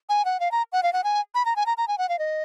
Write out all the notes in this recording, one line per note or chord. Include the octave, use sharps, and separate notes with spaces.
G#5
F#5
F5
A#5
F#5
F5
F#5
G#5
B5
A#5
G#5
A#5
A#5
G#5
F#5
F5
D#5